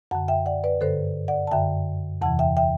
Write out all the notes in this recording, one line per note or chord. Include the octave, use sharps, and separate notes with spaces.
F#2 D3 F#5 A5
E5 G5
D5 F#5
B4 D5
G2 D3 A4 C5
D5 F#5
A5
F#2 D3 E5 G5
E2 C3 E3 F#5 A5
E5 G5
E5 G5